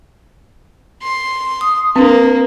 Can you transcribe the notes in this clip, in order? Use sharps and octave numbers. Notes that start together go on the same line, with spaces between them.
C6
D#6
A#3 C4 D4 B4